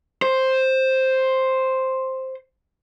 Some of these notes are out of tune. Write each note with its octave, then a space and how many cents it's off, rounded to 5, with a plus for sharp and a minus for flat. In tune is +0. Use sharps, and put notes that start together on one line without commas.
C5 +5